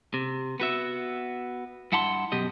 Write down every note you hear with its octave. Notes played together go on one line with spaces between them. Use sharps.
C3
B3 F#4 E5
G2 E4 F#5 A5 B5 C6
F#2 B2 G4 D#5